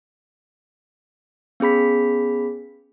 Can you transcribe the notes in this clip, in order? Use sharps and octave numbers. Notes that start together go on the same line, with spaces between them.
B3 C#4 G#4 B5 B6